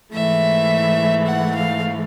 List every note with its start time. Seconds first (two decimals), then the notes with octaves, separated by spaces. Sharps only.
0.13 G#2 E3 A3 E5
1.26 F#5
1.55 F5